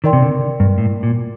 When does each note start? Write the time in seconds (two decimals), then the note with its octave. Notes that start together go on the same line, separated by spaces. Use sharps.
0.04 D#3 A#4 D5 G5 C6
0.13 C3
0.22 D3
0.60 G2
0.78 A2
1.03 A#2